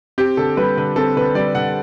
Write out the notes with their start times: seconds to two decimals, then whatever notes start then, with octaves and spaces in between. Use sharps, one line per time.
0.18 C4 G4
0.37 D3 A4
0.57 G3 B4
0.77 D3 B4
0.96 C4 A4
1.17 D3 B4
1.35 G3 D5
1.55 D3 F#5